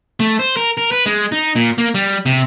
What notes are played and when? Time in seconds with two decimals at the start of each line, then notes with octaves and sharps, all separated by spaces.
0.20 A3
0.39 C5
0.57 A#4
0.77 A#4
0.92 B4
1.06 G#3
1.32 D#4
1.56 A#2
1.78 A#3
1.95 G3
2.26 C3